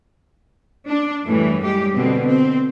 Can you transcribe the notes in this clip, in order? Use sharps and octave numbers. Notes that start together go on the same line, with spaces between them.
D4
F#2 A2 E3 G3 A3
G3 G#3 G4
B2 D3 C4
C4